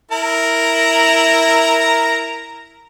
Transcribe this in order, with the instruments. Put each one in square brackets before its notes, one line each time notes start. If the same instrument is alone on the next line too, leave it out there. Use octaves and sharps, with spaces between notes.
[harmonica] E4 A#4 A#5